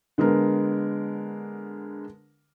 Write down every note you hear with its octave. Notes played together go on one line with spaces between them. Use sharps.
D3 G#3 B3 A#4